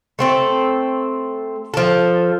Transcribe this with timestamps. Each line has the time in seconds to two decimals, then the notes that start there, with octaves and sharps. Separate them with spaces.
0.19 A3 C4 A4
1.74 F3 A4